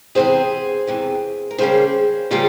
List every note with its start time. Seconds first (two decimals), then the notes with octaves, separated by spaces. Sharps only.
0.15 E2 C3 E3 G#4 C5
0.87 E2 C3 E3
1.51 A#4
1.58 C#3 G3 A#3 C#4 G#4 C5
2.31 C#3 G3 A#3 C#4 F4 G#4